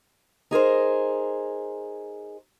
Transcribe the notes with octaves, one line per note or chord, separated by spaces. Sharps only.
D#4 G#4 A#4 C5